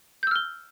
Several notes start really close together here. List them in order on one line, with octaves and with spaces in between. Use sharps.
G6 E6 F6 G7